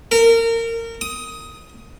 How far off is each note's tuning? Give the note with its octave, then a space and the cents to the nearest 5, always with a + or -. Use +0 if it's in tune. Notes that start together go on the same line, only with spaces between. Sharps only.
A#4 -25
D#6 +15